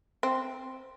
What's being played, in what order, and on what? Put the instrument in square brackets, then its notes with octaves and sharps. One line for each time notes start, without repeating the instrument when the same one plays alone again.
[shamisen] C4